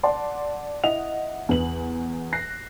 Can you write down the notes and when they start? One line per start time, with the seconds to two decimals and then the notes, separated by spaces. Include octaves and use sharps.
0.03 D5 F#5 A5 C6
0.84 E4 D#5 F#5 F7
1.49 E2 B4 F#7
2.33 F#6 A#6 C7